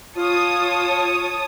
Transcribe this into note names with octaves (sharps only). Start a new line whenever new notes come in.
F4 C#5 A5 D#6